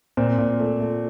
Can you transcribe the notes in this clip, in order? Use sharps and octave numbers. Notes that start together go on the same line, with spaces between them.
A#2 C4
A#2
A3
A3